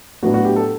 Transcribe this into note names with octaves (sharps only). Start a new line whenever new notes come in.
A2 F#3 B3 D4 F#4
F#4
G4
A4